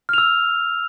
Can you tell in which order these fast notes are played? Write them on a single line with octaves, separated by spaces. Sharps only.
F6 F7 E6